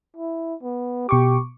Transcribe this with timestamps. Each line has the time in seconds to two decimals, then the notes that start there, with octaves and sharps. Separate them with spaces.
0.16 E4
0.63 B3
1.09 B2 G4 C#6 D6